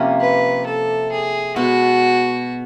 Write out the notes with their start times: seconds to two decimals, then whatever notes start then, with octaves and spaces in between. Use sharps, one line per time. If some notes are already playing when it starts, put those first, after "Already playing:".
Already playing: C3 F3 A#3 C#4
0.20 B4
0.66 A4
1.11 G#4
1.56 B2 G#3 B3 F#4